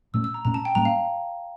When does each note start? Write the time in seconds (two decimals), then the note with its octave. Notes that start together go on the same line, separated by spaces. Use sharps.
0.14 A#2 A3 C#4 E6
0.24 E6
0.34 A#5
0.45 A#2 A3 C#4 A#5
0.54 A5
0.65 G5
0.75 A2 G3 A#3 C#4 A#5
0.85 F5